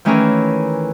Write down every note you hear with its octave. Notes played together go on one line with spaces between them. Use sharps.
D#3 E3 A3 C#4 G#4 A#4